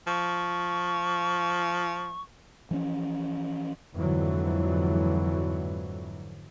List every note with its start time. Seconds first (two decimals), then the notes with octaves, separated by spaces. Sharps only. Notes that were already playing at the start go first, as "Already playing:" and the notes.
0.07 F3 C#6
2.71 E3 F3 C4 C#4
3.94 F2 G#2 D3 E3 F#3